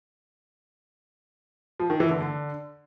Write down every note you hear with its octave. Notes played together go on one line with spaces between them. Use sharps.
F3
D#3
E3
D3
D3